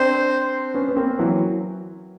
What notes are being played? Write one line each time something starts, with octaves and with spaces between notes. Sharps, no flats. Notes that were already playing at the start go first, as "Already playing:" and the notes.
Already playing: C4 D4 C5
B3 C#4
B3
A#3 C4
E3 F#3